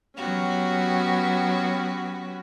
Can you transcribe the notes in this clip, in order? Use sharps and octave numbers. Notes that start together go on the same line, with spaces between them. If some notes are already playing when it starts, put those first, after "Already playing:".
F#3 B3 C#4 F#4 G4